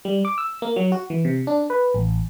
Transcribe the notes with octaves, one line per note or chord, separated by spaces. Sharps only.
G3
D6
E6
A#3
F#3
F#4
E3
C3
D4
B4
A1